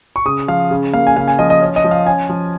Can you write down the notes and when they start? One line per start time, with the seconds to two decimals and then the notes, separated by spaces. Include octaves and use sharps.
0.16 C#6
0.26 C#3 D#6
0.48 F3 F5
0.71 C#3
0.93 A#3 F5
1.07 G#5
1.16 C#3 F5
1.28 G#5
1.39 F3 D#5
1.50 D#5
1.62 C#4
1.76 D#5
1.84 F3
1.91 F5
2.06 C#4 G#5
2.29 F3